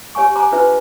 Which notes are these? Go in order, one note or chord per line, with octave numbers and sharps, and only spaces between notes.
G4 C#5 F5 G#5 C#6
C5 G#5 A#5 C6 D6
D4 F4 B4 C5 E5